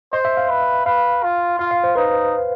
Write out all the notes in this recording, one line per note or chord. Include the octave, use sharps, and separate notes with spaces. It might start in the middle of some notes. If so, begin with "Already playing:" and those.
C5 D#5
E5
F5
B4
B4 F5
F4
F4 F5
F5
C5
D#4 B4